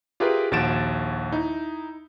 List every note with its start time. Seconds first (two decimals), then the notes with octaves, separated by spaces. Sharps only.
0.20 F4 G4 G#4 A#4 B4 E5
0.51 A#1 D#2 F#4 A6 D7 E7
1.32 D#4 E4